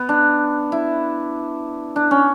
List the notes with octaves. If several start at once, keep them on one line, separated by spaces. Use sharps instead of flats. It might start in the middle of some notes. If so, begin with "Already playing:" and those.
Already playing: B3
D4
E4
D4
C#4